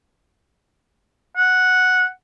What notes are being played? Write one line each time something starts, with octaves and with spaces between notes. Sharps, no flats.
F#5